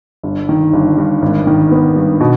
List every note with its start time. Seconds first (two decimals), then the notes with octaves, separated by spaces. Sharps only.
0.23 G1
0.49 D#3
0.73 G1
0.97 G2
1.22 G#1
1.47 D#3
1.71 B3
1.96 G2
2.20 B2